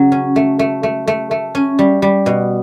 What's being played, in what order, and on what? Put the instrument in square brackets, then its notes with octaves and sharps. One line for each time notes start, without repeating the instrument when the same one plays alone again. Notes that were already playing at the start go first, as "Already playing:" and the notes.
Already playing: [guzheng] C#3 F#3
C#4
A3
A3
A3
A3
A3
C#4
G3
G3
B2